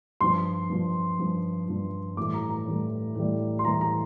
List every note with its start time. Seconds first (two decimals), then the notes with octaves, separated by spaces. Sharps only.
0.21 G2 F3 C6
0.70 G2 F3
1.19 G2 F3
1.68 G2 F3
2.17 A2 E3 G3 D6
2.34 A#5
2.50 A#5
2.66 A2 E3 G3
3.15 A2 E3 G3
3.59 C6
3.65 A2 E3 G3 A#5
3.81 A#5